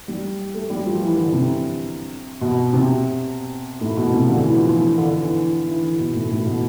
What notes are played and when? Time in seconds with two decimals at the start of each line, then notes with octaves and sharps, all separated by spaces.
0.08 G3
0.54 A3
0.70 G3
0.86 F3
1.01 E3
1.17 D3
1.33 C3
2.41 B2
2.73 C3
3.81 A2
3.97 B2
4.13 C3
4.28 D3
4.43 E3
4.59 F3
4.74 E3
4.98 D3
5.22 E3
5.68 E3
5.84 D3
5.99 B2
6.15 A2
6.31 A2
6.45 B2